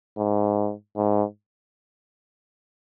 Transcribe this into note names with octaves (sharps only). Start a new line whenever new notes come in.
G#2
G#2